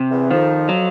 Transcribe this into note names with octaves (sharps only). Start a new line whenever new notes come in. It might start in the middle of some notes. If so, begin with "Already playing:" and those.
Already playing: C3
E2 E3
F2 D#3 F3
F#3